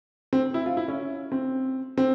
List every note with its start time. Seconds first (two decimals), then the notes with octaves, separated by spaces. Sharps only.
0.33 C4
0.54 E4
0.66 F4
0.77 E4
0.88 C#4
1.32 C4
1.98 C4